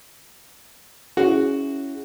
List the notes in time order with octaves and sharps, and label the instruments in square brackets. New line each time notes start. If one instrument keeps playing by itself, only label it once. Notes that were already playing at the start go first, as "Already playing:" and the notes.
[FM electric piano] C#4 E4 G#4 [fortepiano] F#4